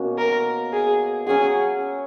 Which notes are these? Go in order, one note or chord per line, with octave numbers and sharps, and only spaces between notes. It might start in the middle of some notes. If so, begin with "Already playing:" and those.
Already playing: B2 A#3 C#4 F#4
A#4
G#4
F#3 C#4 F#4 G#4